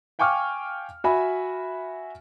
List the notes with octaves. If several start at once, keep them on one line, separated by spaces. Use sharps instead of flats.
F5 G5 G#5 C#6 D6 F6
F#4 E5 G#5 B5